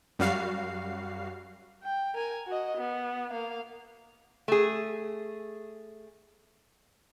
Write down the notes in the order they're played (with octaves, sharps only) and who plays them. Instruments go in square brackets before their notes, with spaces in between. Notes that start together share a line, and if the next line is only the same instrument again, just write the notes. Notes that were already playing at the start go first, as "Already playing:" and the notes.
[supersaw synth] F#2 G3 F#4 F5 C7
[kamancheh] G5
A#4 G#5
F#4 D#5
B3
A#3 F5
[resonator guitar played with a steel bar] A3 G#4